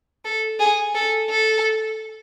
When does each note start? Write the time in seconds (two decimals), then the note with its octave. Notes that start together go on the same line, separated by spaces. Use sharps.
0.25 A4
0.59 G#4
0.95 A4
1.30 A4